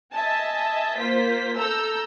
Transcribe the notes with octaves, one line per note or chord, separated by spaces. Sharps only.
D#5 E5 G#5 A5
A#3 F4 C5 B6
A4 A#5 E6 G6